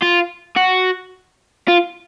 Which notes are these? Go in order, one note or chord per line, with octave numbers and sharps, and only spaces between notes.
F4
F#4
F4